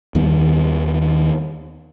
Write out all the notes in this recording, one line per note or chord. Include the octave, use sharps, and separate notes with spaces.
D#2 D#3 G3 B3